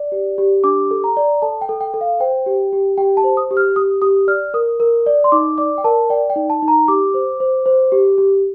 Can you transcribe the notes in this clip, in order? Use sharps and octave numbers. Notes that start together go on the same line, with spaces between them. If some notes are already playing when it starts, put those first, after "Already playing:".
Already playing: D5
G4
G4
D4 D6
A4
A#5
D5
A4 A5
G5
A4
G5
A4
F5
C5 G5
G4
G4
G4 G5
A5
C5
D#6
G4
F6
G4 D#6
G4 D#6
D5 F6
A#4 D#6
A#4
D5
C6
D#4 D6
D5 D6
G5
A#4 A5
D5 G5
G5
D#4
A5
D#4
A#5
G4 D6
C5
C5
C5
G4
G4